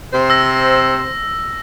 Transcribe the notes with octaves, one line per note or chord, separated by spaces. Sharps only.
C3 C5
E6 A#6